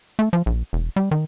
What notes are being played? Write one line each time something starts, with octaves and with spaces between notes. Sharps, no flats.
A3
F3
A#1
E1
G3
D#3